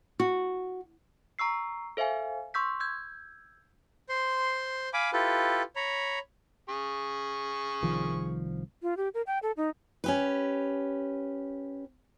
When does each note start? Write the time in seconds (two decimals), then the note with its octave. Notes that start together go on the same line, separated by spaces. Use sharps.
0.20 F#4
1.39 A#5 C#6 E6 C7
1.97 A4 C5 E5 F5 G#5
2.54 C6 C#6 E6 G6 B6
2.80 E6 G6 G#6
4.09 C5 C6
4.93 F5 G#5 B5 D6
5.13 E4 F4 G4 A4 B4
5.76 C#5 A#5 B5
6.69 G#4 C#6
7.82 C2 D#3 F3
8.82 F4
8.97 G4
9.14 A#4
9.27 G5
9.43 A4
9.57 D#4
10.04 C#4 G4 B4